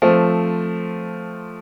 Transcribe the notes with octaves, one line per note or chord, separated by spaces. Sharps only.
F3 A3 C4